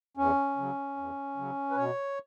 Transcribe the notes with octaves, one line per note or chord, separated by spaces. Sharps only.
E2 C#4
C#3 F#3
E2
C#3 F#3
B4
B2 C#5